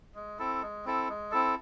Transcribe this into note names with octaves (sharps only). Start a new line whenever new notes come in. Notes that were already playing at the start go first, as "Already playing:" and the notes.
G#3
C4 E4 A4
G#3
C4 E4 A4
G#3
C4 E4 A4